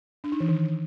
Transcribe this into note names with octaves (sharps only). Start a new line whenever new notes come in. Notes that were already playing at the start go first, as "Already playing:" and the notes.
D4
D#4
E3
D#3